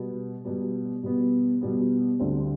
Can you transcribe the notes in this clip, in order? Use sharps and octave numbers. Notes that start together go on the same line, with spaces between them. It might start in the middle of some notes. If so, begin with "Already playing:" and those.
Already playing: B2 G3 B3
B2 G3 B3
B2 G3 B3
B2 G3 B3
D2 D3 G3 C4